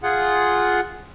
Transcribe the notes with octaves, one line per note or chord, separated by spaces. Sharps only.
F4 G#4 F#5